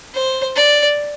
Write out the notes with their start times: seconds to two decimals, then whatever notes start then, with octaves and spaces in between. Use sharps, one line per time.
0.14 C5
0.56 D5